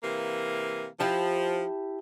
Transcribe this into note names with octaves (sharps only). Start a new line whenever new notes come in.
C3 E3 A#3
F3 E4 G4 A5